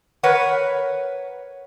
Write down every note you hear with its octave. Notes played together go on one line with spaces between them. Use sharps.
A#4 B4 C#5 F#5